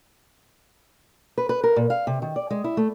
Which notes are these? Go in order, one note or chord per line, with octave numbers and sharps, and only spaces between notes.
B4
B4
A#4
A#2
F5
C3
D#3
D5
G#3
E4
A3